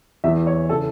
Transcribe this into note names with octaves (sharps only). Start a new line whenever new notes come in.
E2 E3 E5
C#5
C#3 E3 A4